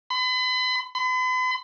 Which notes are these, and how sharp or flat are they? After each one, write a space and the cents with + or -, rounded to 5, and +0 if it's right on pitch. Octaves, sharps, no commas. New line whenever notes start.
B5 +40
B5 +45